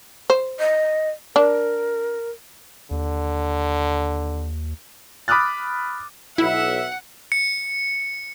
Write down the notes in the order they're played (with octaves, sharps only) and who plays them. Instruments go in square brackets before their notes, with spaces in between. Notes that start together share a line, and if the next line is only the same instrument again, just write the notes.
[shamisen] C5
[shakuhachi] D#5
[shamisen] D4 [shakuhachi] A#4
[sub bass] D#2 [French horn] D3
[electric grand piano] B5 D6 D#6 F6 F#6 A6
[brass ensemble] B1 E5 [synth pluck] E4 [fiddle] F#5
[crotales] C#7